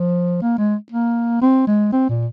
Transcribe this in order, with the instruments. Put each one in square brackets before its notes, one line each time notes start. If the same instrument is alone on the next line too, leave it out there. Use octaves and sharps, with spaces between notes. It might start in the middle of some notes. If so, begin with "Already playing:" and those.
Already playing: [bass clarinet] F3
A#3
G#3
A#3
C4
G#3
C4
A#2